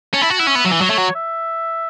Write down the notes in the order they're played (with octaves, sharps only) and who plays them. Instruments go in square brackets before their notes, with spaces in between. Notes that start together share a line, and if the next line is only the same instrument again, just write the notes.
[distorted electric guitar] C#4 [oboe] A5
[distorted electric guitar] E4
F#4
[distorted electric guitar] E4 [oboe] F#5
[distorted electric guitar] C#4 [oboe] E5
[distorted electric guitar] B3
F#3
E3
[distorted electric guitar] F#3 [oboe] C#5
[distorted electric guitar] A3
F#3
[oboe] E5